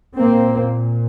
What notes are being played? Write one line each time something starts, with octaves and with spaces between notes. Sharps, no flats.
A#2 A#3 C4